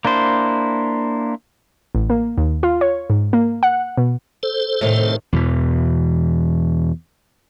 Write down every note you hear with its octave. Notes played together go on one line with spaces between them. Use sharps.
A#3 D4 E4 C5
A1
A#3
D#2
F4
C#5
G#2
A#3
F#5
B2
A4 C5
A2 C3 D#3
E2 B2 E3